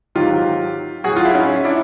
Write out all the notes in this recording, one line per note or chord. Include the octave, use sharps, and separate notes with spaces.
G#2 D#3 F#3 F4 G4
A2 F#3 F#4 G#4
F4
E4
C#4 D#4
D4 E4